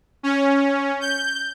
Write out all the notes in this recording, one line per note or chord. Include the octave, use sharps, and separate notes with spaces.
C#4
G6